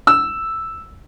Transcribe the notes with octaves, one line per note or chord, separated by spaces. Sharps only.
E6